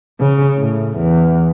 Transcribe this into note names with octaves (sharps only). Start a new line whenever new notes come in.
C#3
A2
E2